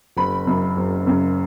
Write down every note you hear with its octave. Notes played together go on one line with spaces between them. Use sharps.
F#1 B5
F#2 C#3
F#1
F#2 C#3